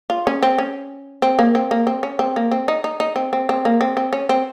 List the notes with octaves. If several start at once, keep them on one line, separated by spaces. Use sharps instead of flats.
F4
C#4
C4
C#4
C4
A#3
C4
A#3
C4
C#4
C4
A#3
C4
D#4
D#4
D#4
C4
C4
C4
A#3
C4
C4
C#4
C4